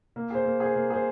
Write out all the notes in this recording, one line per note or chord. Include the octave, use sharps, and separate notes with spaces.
A#3
G#4 C5
A#3
G#4 C5
A#3
G#4 C5